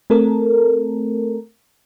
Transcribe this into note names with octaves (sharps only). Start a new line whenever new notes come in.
A3 C4 A4 A#4